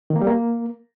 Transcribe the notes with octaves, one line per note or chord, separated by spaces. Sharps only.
D#3
A#3
G3
A#3